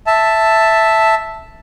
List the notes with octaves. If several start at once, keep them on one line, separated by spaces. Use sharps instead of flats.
E5 A5